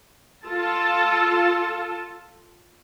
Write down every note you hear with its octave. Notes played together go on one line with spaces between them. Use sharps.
F4 A4 A5